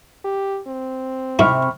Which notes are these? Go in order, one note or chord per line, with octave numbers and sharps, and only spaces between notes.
G4
C4
G#2 C3 E4 E5 B5 C#6 F6